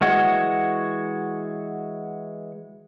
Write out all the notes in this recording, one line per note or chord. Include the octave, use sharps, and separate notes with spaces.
E3 G#3 F#4 C#5